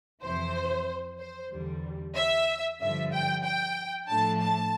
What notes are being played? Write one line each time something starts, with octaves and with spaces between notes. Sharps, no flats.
F2 C3 E3 C5
C5
E2 D3 G3
E5
G2 D3 F3 E5
G5
G5
A2 F3 A3 D4 A5
A5